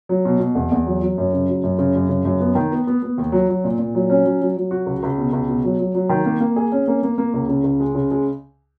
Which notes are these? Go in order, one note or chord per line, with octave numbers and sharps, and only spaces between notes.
F#3
B2
B2
E2
E2
F#3
F#3
F#2
C#3
F#3
F#2
C#3
F#2
C#3
F#2
B3
D#3
B3
B3
B3
D#2
F#3
F#3
A#2
A#2
F#3
C#4
F#3
F#3
F#3
F#4
C#2
C#2
B2
C#2
B2
F#3
F#3
F#3
D#3
A#3
A#3
G#4
C#4
A#3
A#3
A#3
C#2
C#3
C#2
G#3
C#3
G#3